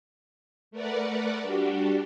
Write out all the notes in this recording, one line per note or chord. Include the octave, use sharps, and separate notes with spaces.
A3 A#4 B4 D5 F#5
G3 D4 F#4 G4